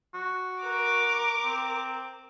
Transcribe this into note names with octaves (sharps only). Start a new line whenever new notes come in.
F#4
A#4 D6
C4